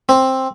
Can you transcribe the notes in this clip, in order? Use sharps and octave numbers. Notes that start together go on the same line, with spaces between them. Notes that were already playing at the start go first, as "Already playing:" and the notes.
C4